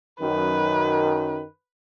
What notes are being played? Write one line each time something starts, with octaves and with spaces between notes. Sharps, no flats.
F#2 D#3 B4